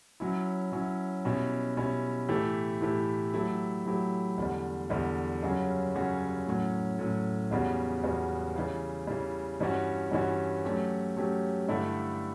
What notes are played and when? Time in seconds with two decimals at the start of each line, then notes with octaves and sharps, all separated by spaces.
0.20 F#3 C#4 E4
0.72 F#3 C#4 E4
1.25 B2 G3 C#4 E4
1.77 B2 G3 C#4 E4
2.29 A2 E3 A3 E4 G4
2.81 A2 E3 A3 E4 G4
3.34 F#3 A3 E4 G4
3.85 F#3 A3 E4 G4
4.38 E2 D3 G3
4.90 E2 D3 G3
5.42 F#2 C#3 G3 C#4 F#4
5.95 F#2 C#3 G3 C#4 F#4
6.47 A2 F#3 C#4
6.99 A2 F#3 C#4
7.51 E2 C#3 G3 B3 F#4
8.03 E2 C#3 G3 B3 F#4
8.56 C#3 E3 G3
9.07 C#3 E3 G3
9.60 G2 E3 G3 C#4 F#4
10.11 G2 E3 G3 C#4 F#4
10.64 F#3 A3 C#4 G4
11.17 F#3 A3 C#4 G4
11.68 G2 D3 A3 E4 G4